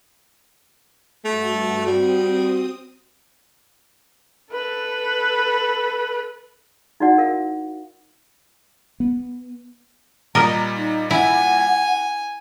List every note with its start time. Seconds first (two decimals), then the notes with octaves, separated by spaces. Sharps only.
1.25 G2 A3 F#4
1.86 G3 C4 F#4 D#6
4.52 A4 B4
7.00 D#4 E4 F#4 D5 F#5
7.18 A#4 F5
9.00 B3
10.35 A#2 G3 A#4 D#5 A#5
10.75 D#4
11.11 E4 F#5 G#5